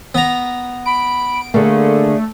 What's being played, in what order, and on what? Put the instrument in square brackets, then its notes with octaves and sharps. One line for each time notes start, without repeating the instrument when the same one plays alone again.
[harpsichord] B3 A#5
[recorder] B5 [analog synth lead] D7
[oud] D3 A#3 [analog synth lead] A3 [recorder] G#4